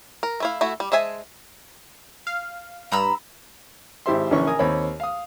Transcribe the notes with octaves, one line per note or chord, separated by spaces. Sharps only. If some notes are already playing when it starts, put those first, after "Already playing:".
A#4
A3 E4 F5
A3 E4 F#4
G3
G#3 C5 E5 G#5 A5
F5
G2 A#5 B5 E6
G#1 E4 G4 C5 E5 C6
A#1 D3 E3 C#4 C#5 C#6
A#4 G#5 D#6
D#2 C4 C#5 B5
F5 D#6